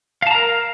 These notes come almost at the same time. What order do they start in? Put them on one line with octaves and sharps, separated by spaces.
F5 A5 A#5 A#4